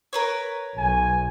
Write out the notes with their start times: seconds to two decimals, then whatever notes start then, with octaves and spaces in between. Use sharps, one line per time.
0.13 A#4 B4 C#5
0.77 B1 G#5